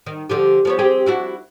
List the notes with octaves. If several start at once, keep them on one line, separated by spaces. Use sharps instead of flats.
D#3
D3 F3 G4
F3 B3 C#5
C4 G4 G#4
D4 E4 F#4